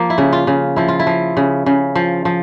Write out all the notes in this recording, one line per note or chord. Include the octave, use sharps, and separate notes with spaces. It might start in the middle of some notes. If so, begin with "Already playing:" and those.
Already playing: F3 A#3
E4
C#3
F4
C#3
F3 E4
F4
E4
F3
C#3
C#3
F3
F3